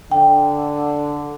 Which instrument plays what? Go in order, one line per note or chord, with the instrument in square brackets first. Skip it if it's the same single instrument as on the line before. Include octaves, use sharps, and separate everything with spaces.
[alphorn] D3 [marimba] G5